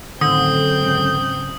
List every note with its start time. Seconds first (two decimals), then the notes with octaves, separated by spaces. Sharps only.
0.21 F#2 A2 D3 D#3 C4 D#6 G6
0.82 G#2 C#3